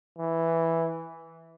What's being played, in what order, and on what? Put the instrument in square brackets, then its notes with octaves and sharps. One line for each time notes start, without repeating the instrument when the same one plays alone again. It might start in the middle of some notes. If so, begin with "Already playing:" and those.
[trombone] E3